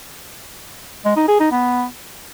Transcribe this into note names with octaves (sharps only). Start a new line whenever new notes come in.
G#3
D#4
G#4
D#4
B3